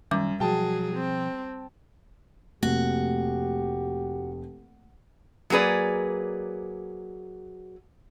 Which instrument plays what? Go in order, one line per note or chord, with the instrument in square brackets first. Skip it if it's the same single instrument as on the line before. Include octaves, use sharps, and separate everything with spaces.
[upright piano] F#2 [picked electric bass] D#3 [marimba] G3 D6
[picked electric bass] B2 F3 [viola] F#3 G#4 [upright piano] G5 A5
[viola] C4
[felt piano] F1 [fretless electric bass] A3 A#3 [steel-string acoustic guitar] F#4 [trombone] G4
[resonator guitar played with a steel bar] F#3 A#3 G#4 B4 D5